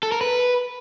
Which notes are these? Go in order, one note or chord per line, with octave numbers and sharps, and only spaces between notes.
A4
A#4
B4